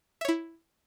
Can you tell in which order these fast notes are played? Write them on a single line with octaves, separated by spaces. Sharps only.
E5 C#5 E4